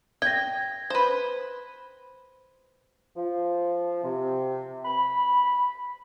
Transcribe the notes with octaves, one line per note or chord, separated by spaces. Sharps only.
G5 G#6 A#6
B4 C5
F3
C3
B5